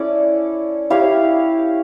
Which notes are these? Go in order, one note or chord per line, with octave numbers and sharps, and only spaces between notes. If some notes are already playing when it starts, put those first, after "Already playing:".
Already playing: C#4 E4 A4 D5
E4 G4 C#5 F5